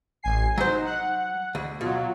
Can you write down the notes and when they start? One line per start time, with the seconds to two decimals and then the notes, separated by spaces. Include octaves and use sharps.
0.23 A1 G#5 C7
0.58 F#3 D#4 C5
0.85 F#5
1.55 D2
1.81 B2 F#3 F4